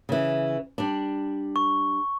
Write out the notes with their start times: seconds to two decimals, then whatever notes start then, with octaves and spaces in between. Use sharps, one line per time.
0.09 C#3 E3
0.78 G3 D4
1.56 C#6